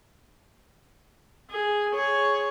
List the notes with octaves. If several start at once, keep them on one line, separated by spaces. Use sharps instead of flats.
G#4
G#4 C#5